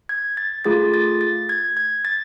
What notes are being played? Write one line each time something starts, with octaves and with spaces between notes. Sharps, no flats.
G#6
A6
A3 F4 G#4 A6
A6
A6
G#6
G#6
A6